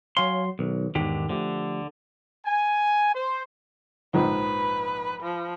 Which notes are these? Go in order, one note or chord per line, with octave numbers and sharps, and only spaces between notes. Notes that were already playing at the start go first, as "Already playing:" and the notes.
F#3 C#5 F5 G#5 C6
B1 D#3
E2 G#2 D3 D#3 G4
D3 F3 A3 G4
G#5
C5
A#1 G#2 F3 B4
F3